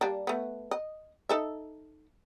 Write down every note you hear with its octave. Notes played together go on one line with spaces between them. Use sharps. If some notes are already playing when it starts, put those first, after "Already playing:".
G3 A#3 D4
A3 B3
D#5
D#4 A4 E5